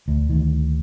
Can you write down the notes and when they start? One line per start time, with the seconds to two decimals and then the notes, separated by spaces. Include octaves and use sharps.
0.08 D2
0.29 D2 D#3